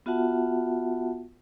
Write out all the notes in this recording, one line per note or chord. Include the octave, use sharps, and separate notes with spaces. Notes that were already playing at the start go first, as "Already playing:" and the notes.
B3 F4 F#4 E5 F#5 A5